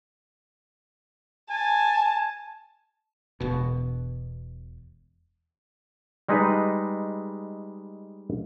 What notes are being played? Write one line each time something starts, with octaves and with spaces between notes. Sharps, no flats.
G#5 A5
E1 B2
G3 G#3 D#4 B4